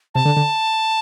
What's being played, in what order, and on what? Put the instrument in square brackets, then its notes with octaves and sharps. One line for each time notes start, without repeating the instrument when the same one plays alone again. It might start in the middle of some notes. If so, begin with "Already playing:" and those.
[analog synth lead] C3 [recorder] A5
[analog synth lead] D3
D3